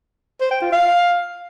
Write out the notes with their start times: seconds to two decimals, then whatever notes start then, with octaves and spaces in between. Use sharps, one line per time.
0.40 C5
0.51 G5
0.61 F4
0.72 F5